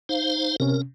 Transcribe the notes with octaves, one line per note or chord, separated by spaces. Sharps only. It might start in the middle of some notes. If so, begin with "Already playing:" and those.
D#4 C5 F5
C3 C#4 A#4